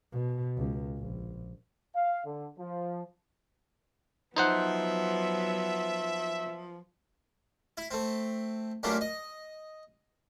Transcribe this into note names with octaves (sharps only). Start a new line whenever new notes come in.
B2
C#2
A#1
F5
D3
F3
F3 F#3 B3 D#4 C5 E5 F#5
E4
A3 C4
F#2 G3 A3 A#3 D4 F4
D#5